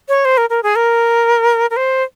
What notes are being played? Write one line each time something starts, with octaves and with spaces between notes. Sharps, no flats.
C#5
C5
A#4
A#4
G#4
A#4
A#4
C5